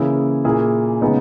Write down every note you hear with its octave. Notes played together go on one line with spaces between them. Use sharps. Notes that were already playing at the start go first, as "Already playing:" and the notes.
Already playing: C#3 E3 A#3 E4 G#4
A#2 A#3 E4 G#4
C#3 G#3 B3 D#4